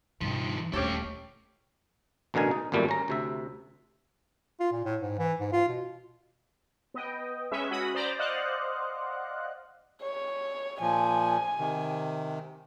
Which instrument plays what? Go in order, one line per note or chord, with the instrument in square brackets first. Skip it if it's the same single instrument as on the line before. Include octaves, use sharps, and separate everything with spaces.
[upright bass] G2 B2 [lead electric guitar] D#3 F3
[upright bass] D#1 D2 [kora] C#4 G4 C#5 [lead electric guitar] A4 G5
[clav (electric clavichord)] A1 B2 D3 A#4 G#5
D#4
G#1 F#2 A#2 G3 A3 G4
C#4 A#5
D2 C3 E5
[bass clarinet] F4
A#2
A2
G#2
E3
G#2
F4
B2
[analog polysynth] B3 D#5 G5
G#3 C#4 B4 E5
C#4 F#4 B5 D#6
C5 D5 A#5 B5 D6
C5 D5 D#5 F5 F#5 F#6
[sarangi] C#5
[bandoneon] A#2 F3 [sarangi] G#5
[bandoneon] C3 D#3